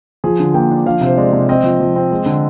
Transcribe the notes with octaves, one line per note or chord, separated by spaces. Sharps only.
F3 G#4
D3
A#3 G5
D4
F3 F5
C3 C5
G#3 D5
C3
C4 D#5
F3
F3
C4
G#3
D3